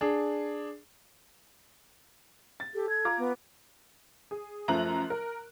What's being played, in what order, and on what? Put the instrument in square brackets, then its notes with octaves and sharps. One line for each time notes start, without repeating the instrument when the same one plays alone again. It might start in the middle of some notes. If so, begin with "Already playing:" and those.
[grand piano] D4 G#4
[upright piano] A6
[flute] G4 [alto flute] A4
[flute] G#6
[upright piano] F4 A#5 D6
[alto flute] B3
[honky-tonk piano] G#4
F#2 F3 A3 A#5 F#6 F#7
A#4